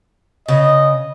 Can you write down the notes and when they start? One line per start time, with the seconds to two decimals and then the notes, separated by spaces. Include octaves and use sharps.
0.48 C#3 D#5